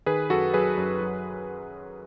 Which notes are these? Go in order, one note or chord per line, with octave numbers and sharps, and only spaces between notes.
D#3 G#4 B4
F#2 F#4 A4
F#3 G#4 B4
F#2
F#3